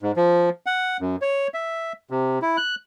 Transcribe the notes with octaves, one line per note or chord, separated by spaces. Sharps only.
G#2
F3
F#5
F#2
C#5
E5
C3
E4
F#6